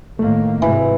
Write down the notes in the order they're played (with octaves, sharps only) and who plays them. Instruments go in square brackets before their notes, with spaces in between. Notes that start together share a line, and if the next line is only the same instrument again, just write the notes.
[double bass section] A2 D#3 A#3 [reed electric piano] A3
[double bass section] G#1 G#2 C3 [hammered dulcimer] E3